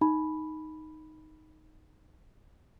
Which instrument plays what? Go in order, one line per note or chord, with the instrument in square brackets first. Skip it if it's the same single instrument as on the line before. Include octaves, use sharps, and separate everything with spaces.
[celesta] D#4 B5